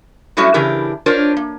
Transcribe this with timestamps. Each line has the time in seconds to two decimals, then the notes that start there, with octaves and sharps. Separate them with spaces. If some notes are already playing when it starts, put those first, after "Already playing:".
0.37 F#3 G3 A3 C#4 E4 F#4
0.54 C#3 E3 D4 E4 G4 A#4
1.06 D4 F4 A#4 C5 C#5
1.37 A#3